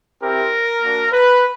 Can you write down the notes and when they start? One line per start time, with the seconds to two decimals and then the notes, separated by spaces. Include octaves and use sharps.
0.22 C4 E4 G4 A#4
0.82 A#3 D4 F#4
1.12 B4